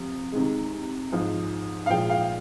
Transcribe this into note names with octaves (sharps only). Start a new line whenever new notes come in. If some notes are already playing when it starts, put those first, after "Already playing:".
Already playing: C3 F3
C3 D#3 G#3
G#2 F3 G#3
F5
A#2 F3 G#3 G5
F5